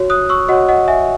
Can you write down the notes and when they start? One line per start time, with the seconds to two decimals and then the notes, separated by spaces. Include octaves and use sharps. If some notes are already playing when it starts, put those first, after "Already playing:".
Already playing: F#4 C#5
0.10 D#6 F#6
0.29 C#6 E6
0.49 F#4 C#5 D#5 F#5
0.69 D#5 F#5
0.88 E5 G#5